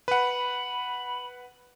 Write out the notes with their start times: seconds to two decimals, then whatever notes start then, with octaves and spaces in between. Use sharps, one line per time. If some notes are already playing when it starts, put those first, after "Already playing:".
0.08 B4 F#5 B5